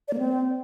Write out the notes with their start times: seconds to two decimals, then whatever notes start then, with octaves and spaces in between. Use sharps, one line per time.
0.08 D5
0.13 A#3
0.19 C4